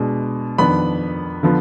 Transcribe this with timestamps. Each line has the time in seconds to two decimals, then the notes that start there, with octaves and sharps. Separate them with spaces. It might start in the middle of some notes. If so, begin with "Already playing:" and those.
Already playing: B2 G#3 D4
0.58 F2 D#3 B3 D4 B5
1.43 D3 F3 B3